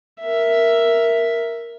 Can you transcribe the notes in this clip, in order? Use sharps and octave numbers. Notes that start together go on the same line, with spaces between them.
A#4 E5